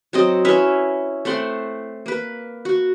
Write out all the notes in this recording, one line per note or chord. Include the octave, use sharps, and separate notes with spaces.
F#3 C4 D#5
C#4 E4 B4 E5
A3 C4 F#5 C6
A#3 B4
F#4